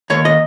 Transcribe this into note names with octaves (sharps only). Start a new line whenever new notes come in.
D#2 C#5
D#5